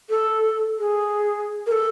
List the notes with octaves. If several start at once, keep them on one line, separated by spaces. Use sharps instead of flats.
A4
G#4
A#4
A4